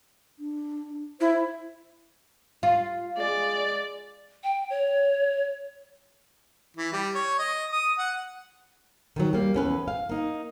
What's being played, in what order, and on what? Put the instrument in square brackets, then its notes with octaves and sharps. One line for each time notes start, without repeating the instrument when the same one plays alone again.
[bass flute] D4
[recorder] E4 [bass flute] C5
[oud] F4 [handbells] F5
[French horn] G#3 [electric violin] D5
[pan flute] G5
C#5
[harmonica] E3
G3
C#5
D#5
D#6
F#5
[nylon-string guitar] D#3 E3 F#3
G3 A#3
E2 C#4 B4
F5
A#3 D#4